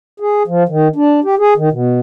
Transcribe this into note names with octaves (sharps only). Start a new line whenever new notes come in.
G#4
F3
D#3
D4
G4
G#4
D#3
B2